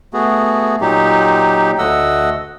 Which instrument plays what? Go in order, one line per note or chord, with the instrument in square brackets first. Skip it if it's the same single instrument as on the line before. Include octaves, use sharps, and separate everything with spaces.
[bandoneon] A3 B3 F#4 G#4
A#2 F#3 D#4 G4
D2 A3 D#5 F#5 E6